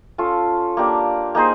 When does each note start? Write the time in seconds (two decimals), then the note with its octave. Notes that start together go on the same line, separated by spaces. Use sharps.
0.18 C#4 F4 A4
0.77 A#3 D4 G4
1.35 A#3 D#4 G#4 C5